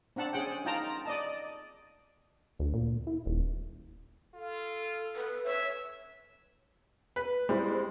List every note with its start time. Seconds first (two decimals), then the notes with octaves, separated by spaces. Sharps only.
0.16 C4 D4 F#5 A5
0.33 C#4 G#4 F#5 G5
0.65 D#4 F4 G5 A5 A#5
1.05 D5 D#5 A5
2.59 D2
2.74 A#2
3.07 E4
3.26 D#1
4.34 F4 A4
5.16 B4
5.45 B4 C#5 E5
7.16 B4
7.49 G3 G#3 C4 E4